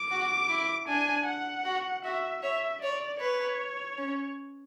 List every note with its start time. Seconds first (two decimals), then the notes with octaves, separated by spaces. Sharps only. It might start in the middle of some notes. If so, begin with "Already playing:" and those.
Already playing: D6
0.11 F#4
0.49 E4
0.88 D4 G#5
1.27 F#5
1.65 F#4
2.04 F#4 E5
2.43 C#5 E5
2.82 C#5 D5
3.20 B4 C#5
3.98 C#4